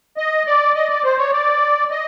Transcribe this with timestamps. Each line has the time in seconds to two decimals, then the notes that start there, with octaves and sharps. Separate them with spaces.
0.17 D#5
0.47 D5
0.75 D#5
0.89 D5
1.04 C5
1.18 C#5
1.32 D5
1.91 D#5